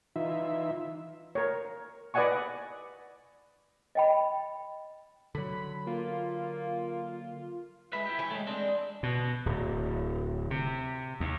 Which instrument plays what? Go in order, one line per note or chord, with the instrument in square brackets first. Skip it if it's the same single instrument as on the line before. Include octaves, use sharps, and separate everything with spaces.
[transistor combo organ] E3 D#4 F4 E5
[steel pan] A#4 C#5
B4 D5 D#5 F#5 G#5 C#6
[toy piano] D#5 G5 B5
[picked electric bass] D3 F#3 [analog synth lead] B5
[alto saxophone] A#3 [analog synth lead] F4
[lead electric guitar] G#3 E5 [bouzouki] B4
[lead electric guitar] E4 G4
[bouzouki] E3 C#5 G5
[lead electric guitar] G#3 A3
[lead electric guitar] G#3 C4 [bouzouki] D4
[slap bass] B2
D1
C3
D#2